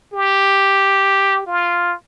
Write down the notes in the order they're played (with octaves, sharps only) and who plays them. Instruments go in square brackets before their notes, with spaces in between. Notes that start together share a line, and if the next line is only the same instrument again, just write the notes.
[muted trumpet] G4
F4